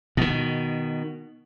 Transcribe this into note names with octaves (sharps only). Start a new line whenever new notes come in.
B2 D#3